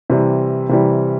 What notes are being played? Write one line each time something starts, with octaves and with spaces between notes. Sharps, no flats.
C3 E3 G3
C3 E3 G3